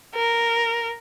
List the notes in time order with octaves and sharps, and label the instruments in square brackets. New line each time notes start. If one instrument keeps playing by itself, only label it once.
[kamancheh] A#4